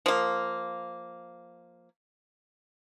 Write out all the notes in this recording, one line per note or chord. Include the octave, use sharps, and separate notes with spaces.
F3 A#3